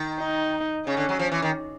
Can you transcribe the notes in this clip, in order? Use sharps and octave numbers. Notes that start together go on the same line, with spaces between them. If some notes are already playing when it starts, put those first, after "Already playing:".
Already playing: D#3
D#4
C#3 C#4
D3
F#3
F3
E3
D#3